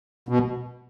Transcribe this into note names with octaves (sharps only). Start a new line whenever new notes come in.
B2